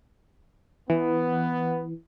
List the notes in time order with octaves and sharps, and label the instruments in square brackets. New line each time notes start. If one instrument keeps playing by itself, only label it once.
[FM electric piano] E3 [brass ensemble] B3